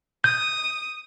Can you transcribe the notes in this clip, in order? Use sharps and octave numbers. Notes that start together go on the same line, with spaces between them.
D#6 G6